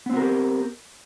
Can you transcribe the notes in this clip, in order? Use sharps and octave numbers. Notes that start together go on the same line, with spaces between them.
B3 C4 F#4 G4 A#4